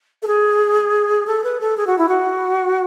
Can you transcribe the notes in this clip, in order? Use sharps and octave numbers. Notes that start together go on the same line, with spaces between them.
A4
G#4
A4
B4
A4
G#4
F#4
E4
F#4